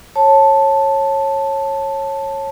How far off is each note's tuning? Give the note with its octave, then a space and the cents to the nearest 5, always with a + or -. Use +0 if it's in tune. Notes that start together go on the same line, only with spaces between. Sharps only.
C#5 -20 A5 +0